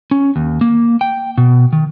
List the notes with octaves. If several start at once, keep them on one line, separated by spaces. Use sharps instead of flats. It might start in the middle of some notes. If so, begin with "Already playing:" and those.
C#4
D#2
A#3
G5
B2
D#3